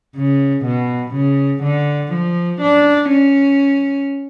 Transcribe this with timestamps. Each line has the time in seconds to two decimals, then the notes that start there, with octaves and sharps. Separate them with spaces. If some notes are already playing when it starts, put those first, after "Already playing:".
0.16 C#3
0.65 B2
1.14 C#3
1.63 D3
2.12 F3
2.61 D4
3.10 C#4